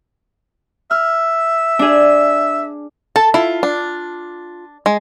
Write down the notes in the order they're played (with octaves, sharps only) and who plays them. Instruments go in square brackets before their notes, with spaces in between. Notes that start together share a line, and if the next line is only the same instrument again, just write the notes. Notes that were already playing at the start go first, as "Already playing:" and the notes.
[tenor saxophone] E5 [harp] F6
[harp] D4 G#4
[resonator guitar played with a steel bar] A4 [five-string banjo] A5
[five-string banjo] E4 [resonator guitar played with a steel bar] F4
[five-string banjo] D4
G#3